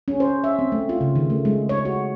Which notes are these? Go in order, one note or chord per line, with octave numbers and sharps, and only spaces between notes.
C#4
C5
E5
C4
A3
F4
C#3
D#3
A3
G#3
C#5
F#4